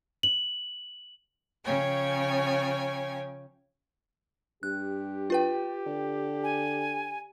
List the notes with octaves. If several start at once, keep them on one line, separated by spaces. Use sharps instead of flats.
F#7
C#3 F3 C#5 G5 G#5
G2 G4 F#6
F4 B4 G5
D3
G#5